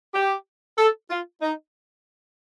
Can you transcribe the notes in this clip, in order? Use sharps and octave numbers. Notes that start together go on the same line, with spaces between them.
G4
A4
F4
D#4